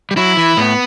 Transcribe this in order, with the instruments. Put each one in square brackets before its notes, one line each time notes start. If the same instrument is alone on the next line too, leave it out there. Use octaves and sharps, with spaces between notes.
[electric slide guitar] G3
[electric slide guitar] F#3 [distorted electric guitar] E4
[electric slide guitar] E3
[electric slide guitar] A2 [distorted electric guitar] B3